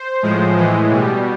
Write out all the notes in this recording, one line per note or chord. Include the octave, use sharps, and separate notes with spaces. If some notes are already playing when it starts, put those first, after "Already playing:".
Already playing: C5
A2 F3 G#3
A2 E3 G#3
B2 G3